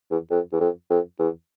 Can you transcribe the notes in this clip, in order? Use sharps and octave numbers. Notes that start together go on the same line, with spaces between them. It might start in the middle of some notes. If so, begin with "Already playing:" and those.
E2
F2
E2
F2
F2
E2